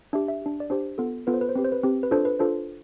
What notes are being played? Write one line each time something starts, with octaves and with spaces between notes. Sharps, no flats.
D4 G4 E5
E5
D4 G4
D5
D4 G4 C5
B3 F4 A4
B3 F4 A4 B4
C5
B4
C5
C4 G4 B4
C5
B4
C4 G4
B4
D4 F4 A4 C5
B4
D4 F4 A4 C5